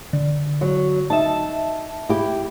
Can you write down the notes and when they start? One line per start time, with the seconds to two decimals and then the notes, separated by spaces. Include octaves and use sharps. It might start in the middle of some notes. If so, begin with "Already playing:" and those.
0.13 D3
0.61 F#3
1.10 D#4 E5 A5
2.09 E4 G4